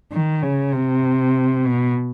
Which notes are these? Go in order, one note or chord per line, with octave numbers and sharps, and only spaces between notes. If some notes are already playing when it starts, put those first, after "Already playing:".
D#3
C#3
C3
B2